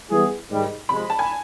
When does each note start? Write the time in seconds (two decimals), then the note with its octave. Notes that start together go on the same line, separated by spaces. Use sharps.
0.10 E3 G3 B3 E4 G#4
0.49 G#2 D#3 G3
0.89 C3 F3 G#3 B5
1.10 A5
1.19 G#5